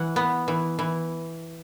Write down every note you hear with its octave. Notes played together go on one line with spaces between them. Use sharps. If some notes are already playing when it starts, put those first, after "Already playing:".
Already playing: E3 F#5
B3
E3
E3